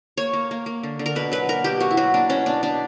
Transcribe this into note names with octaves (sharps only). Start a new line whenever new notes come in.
A#3 C#5
A#3
A#3
A#3
D3
D3
A#4
B2 B4
F#3 B4
A#3 A#4
B2 G4
A#3 F#4
E4
F#3 F#4
A#3 D4
B2 C#4
B2 D4
B2 D4